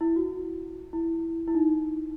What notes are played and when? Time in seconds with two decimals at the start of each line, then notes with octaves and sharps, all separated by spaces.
0.01 E4
0.16 F#4
0.93 E4
1.48 E4
1.55 D#4